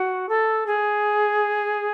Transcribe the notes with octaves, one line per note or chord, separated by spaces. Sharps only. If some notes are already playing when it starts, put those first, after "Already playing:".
Already playing: F#4
A4
G#4